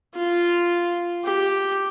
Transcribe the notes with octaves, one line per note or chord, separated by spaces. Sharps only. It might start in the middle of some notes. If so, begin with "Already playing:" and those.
F4
G4